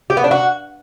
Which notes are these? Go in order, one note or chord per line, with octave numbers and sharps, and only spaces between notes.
G4
B3
D4
F#4